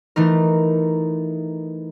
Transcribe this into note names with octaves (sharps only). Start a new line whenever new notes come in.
E3 A3 D#4 A#4